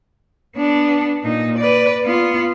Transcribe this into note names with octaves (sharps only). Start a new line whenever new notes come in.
B3 D4
A#2 D#4
B4 D5
B3 F4